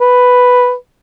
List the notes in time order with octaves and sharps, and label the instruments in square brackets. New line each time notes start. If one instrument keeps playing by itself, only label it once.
[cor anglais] B4